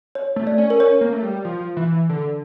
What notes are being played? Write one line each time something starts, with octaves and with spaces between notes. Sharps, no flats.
C#5
A3
D5
C#4
A#4
C#4 C#5
A#3
A3
G3
F3
E3
D3